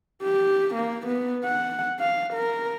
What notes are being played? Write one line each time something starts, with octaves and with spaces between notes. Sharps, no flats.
G4
A#3
B3
F#5
F5
A#4